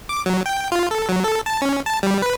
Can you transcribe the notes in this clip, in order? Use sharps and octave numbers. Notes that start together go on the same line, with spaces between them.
D6
F#3
G5
F4
A4
F#3
A4
A5
C#4
A5
G3
B4